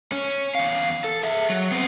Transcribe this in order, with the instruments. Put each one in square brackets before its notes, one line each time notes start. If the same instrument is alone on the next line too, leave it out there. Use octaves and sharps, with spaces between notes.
[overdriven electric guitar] C#4
E2 F5
A4
G#4 E5
F#3
B3 C4